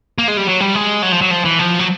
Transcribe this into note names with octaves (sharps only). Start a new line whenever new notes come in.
A#3
G#3
G3
F#3
G3
G#3
F#3
F3
F#3
F3
E3
F3
F#3